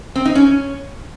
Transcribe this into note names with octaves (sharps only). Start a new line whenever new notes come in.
C4
D#4
C#4